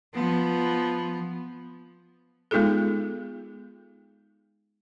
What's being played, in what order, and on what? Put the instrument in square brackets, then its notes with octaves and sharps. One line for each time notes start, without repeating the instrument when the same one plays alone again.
[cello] F3 B3
[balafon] G#3 B3 D#4 F4 G#4 A4